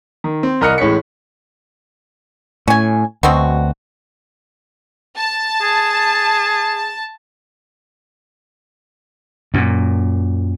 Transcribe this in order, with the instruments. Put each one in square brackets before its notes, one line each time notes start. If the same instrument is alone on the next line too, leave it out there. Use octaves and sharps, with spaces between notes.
[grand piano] D#3
C4
C2 A#4 D#5 F6 F#6 C#7
A1 A2 G#3 C#5 B6 C#7
[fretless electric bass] A2 [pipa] C#4 G#5
[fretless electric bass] D2 [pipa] B2 C4 F#4
[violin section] A5
[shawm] G#4
[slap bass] F#2 A#2